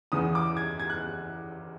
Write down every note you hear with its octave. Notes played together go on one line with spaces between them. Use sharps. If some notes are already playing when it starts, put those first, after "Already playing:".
E2 C#3 E3 D#6
D6
G#6
G#6
F#6